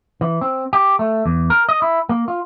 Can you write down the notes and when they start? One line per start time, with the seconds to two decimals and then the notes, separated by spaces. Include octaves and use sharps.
0.21 E3
0.41 C4
0.73 G4
0.99 A3
1.26 E2
1.50 A#4
1.69 D#5
1.82 E4
2.09 A#3
2.28 F4